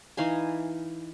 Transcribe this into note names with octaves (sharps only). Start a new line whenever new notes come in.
E3 D#4 F5 G#5